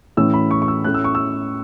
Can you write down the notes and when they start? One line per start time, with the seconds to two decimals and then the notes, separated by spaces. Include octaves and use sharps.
0.17 A2 E3 C#4 E6
0.34 B5
0.51 C#6
0.62 C#6
0.68 E6
0.84 A2 A3 C#4 F#6
0.94 E6
1.04 C#6
1.15 E6